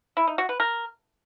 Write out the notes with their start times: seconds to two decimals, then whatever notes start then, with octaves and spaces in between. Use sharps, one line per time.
0.17 E4
0.27 D#4
0.38 F#4
0.49 B4
0.60 A#4